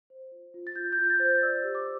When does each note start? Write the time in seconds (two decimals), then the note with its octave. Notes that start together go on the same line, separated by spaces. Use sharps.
0.10 C5
0.31 F4
0.54 F4
0.67 A6
0.76 F4 G6
0.92 G6
0.98 F4
1.04 G6
1.10 A6
1.20 C5
1.25 G6
1.42 D5 E6
1.64 G4
1.75 D6